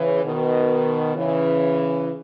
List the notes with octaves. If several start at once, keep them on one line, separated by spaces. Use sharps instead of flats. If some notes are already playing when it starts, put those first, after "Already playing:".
Already playing: C#3 E3
B2 D#3
C#3 E3